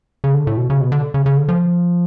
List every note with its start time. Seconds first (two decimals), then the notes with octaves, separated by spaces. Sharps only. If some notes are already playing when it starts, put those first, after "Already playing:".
0.24 C#3
0.34 D3
0.47 A2
0.57 B2
0.70 C#3
0.81 B2
0.92 D3
1.14 C#3
1.26 C#3
1.37 D3
1.49 F3